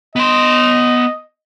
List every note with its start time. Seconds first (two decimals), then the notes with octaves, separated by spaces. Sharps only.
0.16 B3 D#5 C6